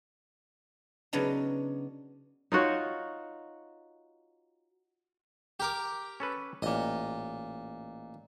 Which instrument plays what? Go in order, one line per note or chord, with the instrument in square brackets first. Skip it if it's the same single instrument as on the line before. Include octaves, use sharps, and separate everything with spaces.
[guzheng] C#3 F#3 B3 D4 D#4
[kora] D#4 F4 F#4 C#5
[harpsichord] G4 A#4 D6
[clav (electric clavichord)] C#4 A4 B4
[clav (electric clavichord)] A1 [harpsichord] A#2 D#5